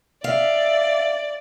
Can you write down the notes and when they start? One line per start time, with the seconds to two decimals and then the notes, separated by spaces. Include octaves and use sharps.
0.24 D5 E5 F5